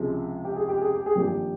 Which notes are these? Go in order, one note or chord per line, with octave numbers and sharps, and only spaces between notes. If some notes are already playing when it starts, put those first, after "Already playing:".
Already playing: C#2 C3 F3 G#3
G4
G#4
G4
G#4
G4
G#4
G#1 G2 F3 A#3 G4